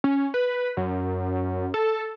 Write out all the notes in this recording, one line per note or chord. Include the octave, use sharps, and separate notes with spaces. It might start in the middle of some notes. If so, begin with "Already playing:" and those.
C#4
B4
F#2
A4